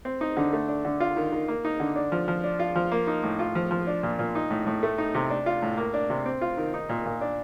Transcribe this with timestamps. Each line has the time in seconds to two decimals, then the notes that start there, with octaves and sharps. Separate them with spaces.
0.05 C4
0.21 D#4
0.37 D3
0.53 A3
0.68 D4
0.85 D3
1.00 F4
1.17 D#3
1.32 D#3
1.48 A#3
1.65 D#4
1.80 D3
1.96 D4
2.12 F3
2.28 F3
2.44 D4
2.59 F4
2.76 F3
2.91 A#3
3.07 D#4
3.23 A2
3.39 F4
3.55 F3
3.71 F3
3.87 D4
4.03 A#2
4.19 A#2
4.35 D#4
4.51 A2
4.67 A2
4.83 A3
4.98 D#4
5.14 C3
5.30 D4
5.46 F4
5.62 A2
5.77 A#3
5.94 D4
6.10 C3
6.26 C4
6.41 F4
6.58 D#3
6.74 D#4
6.89 A#2
7.06 A#2
7.21 D4